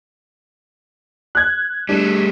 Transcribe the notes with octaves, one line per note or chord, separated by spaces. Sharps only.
F#6 G#6
G3 A3 D4